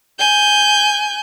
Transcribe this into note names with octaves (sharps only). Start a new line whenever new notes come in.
G#5 G6